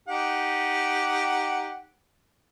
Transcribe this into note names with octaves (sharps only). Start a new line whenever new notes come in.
D#4 G4 F#5